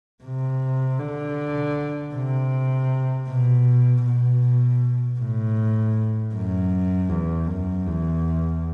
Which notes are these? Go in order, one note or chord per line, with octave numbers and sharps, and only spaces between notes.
C3
D3
C3
B2
B2
A2
F#2
E2
F#2
E2